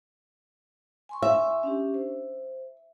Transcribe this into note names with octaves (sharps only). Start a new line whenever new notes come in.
G#5 C6 C#6
E5
C#4 D4 G4
C5